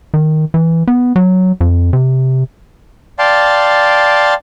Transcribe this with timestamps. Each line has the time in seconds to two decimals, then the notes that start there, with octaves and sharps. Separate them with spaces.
0.14 D#3
0.54 E3
0.88 B3
1.16 F#3
1.61 F2
1.93 C3
3.19 D5 F5 G5 A5 C6